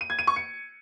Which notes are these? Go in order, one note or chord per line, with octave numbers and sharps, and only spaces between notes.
D#7
G#6
D#7
C#6
C#7